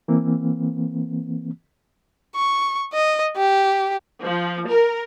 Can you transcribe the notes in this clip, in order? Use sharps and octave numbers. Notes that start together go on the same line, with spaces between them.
E3 A#3 C4
C#6
D#5
G4
F3
A#4